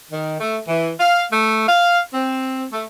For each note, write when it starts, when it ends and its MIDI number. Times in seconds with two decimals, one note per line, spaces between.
0.12 0.35 51
0.40 0.58 57
0.67 0.90 52
1.00 1.25 77
1.32 1.64 57
1.68 2.00 77
2.14 2.64 60
2.72 2.84 57